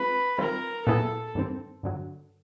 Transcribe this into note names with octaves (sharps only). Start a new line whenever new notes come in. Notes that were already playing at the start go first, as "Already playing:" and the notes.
Already playing: G#3 C4 F4 B4
D#3 G3 C4 F4 A#4
A#2 F#3 B3 E4 G#4 A4
G2 D#3 G3 C4
G2 D3 F#3